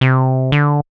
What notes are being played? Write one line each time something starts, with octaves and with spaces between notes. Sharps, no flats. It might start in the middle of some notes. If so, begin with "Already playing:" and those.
C3
D3